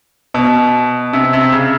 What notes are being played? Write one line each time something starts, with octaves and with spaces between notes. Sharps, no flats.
B2
C3
C3
C#3